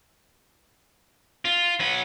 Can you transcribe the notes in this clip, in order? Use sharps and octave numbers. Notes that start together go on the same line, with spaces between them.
F4
F#3 B4